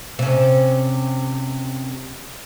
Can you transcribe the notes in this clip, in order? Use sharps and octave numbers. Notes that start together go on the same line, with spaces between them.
C3 C#4